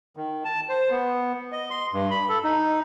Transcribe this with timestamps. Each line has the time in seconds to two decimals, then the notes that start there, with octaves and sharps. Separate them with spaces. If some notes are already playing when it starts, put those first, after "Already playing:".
0.17 D#3
0.45 A5
0.69 C5
0.90 B3
1.52 D#5
1.70 C6
1.93 G2
2.11 B5
2.29 A4
2.44 D#4